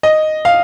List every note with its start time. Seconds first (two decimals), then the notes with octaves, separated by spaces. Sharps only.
0.03 D#5
0.45 F5